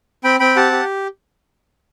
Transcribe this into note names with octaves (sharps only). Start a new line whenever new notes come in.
C4 G5 B5
C4 G5 B5
G4 F#5 A5
G4